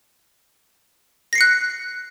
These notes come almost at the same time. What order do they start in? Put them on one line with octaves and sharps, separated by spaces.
A#6 C7 C#7 F#6